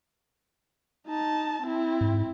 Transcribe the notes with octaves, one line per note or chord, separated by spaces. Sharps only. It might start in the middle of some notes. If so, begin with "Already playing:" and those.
D#4 A5
C4 E4
G#2